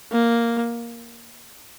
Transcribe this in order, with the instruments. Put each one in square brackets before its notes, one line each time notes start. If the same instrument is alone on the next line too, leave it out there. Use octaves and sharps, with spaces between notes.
[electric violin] A#3